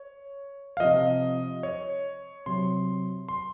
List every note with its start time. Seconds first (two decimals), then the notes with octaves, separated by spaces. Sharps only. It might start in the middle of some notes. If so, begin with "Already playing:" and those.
Already playing: C#5
0.77 F5
0.80 C3 F3 D#5
1.63 C#5
2.46 C3 F#3 C6
3.29 C6